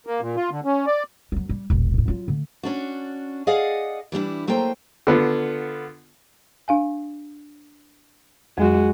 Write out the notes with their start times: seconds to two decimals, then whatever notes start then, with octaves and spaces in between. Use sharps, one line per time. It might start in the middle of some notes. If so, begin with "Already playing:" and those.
0.07 A#3
0.21 A#2
0.36 F4
0.51 D3
0.65 C#4
0.86 D5
1.32 F#2 F#3
1.49 G3
1.70 E1 A#1
1.94 D#2 A2
2.08 F#3 F4
2.28 D3 A3
2.63 C#4 D4 F#4
3.47 G#4 D5 D#5 F5 F#5
4.12 E3 G3 D4 E4
4.47 F#3 A3 A#3 C5 G5
5.07 D3 B3 F4
6.68 D4 F5 G#5
8.58 F2 F#3 G#3 F#4